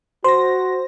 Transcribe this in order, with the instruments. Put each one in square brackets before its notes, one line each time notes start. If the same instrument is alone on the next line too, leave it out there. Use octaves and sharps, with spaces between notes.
[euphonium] F#4 [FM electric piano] C5 A#6 [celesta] C6